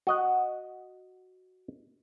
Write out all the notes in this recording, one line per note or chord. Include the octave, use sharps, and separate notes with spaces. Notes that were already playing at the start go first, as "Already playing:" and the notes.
F#4 D#5 F#5